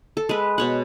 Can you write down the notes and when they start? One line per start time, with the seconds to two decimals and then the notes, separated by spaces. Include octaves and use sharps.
0.17 A4
0.29 G#3 B4
0.58 B2 C#5 F#5